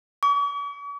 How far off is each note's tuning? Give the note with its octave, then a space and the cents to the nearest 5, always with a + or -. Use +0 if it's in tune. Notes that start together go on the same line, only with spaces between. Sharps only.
C#6 +45